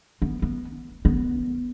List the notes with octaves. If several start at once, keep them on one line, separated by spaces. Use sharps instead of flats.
B3
B3
B3